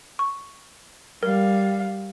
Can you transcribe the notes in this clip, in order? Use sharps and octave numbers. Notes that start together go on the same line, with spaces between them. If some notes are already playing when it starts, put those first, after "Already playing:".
C#6
G3 A#4 F5